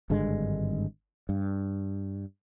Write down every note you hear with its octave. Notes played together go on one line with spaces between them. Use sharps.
G#1 G2 D3 G#3
G2